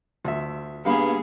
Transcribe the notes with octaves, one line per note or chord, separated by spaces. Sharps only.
D2 F4 E5
G2 A#3 B3 D#4 G#4 F5 B5